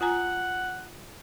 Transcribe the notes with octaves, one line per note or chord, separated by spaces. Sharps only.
F4 F#5 G#5 A#5